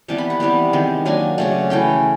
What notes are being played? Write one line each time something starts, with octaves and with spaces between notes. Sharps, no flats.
C3 E3 G3 B3 A5
B5
F#5
C3 E3 G3 B3
D#3 G#3 C4
F#3 A#3 D4 G#5
C#3 F#3 A3
E3 A3 C#4 G5